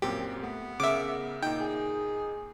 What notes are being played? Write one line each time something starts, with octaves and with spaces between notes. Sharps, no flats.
F#2 A#2 C4 G4
A3 B3
C#3 A#4 E5 D6
A#2 D#4 G5
G#4